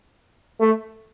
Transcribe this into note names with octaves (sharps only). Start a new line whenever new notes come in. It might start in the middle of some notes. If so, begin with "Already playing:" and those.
A3